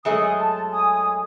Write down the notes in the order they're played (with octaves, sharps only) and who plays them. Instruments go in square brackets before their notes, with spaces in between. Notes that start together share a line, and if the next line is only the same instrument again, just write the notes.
[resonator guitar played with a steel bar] F#2 G#3 A3 [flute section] G#5 D#6
[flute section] A5
G#5 D#6